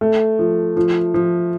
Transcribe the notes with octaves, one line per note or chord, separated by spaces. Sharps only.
A3
F3
F3
F3